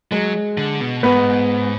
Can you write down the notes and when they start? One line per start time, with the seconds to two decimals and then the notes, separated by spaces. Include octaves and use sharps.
0.12 F#3 G#3
0.58 D3
0.81 B2
1.03 G#2 B3